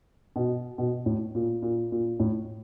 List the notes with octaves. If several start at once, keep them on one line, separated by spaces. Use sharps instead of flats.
B2
B2
A2
A#2
A#2
A#2
A2